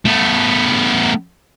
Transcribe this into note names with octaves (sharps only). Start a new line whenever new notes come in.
A3 B3